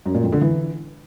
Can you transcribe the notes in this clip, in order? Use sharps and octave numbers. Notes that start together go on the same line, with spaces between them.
F#2
A#2
F2
D3
E3